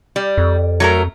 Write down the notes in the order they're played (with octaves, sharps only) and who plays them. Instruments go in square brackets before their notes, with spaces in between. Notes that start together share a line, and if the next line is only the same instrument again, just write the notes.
[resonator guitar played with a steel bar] G3
[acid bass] F2
[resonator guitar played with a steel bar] F#3 A3 A#4